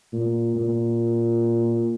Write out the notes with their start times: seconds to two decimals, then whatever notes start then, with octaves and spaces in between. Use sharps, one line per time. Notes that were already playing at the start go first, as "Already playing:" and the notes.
0.13 A#2
0.56 A#2